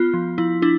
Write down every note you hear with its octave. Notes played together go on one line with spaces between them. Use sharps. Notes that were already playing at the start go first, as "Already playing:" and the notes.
Already playing: B3 F4
F3
F3 E4
D4 E4